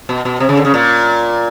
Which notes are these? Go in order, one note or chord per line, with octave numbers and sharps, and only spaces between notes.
B2
B2
C3
C#3
D3
C#3
A#2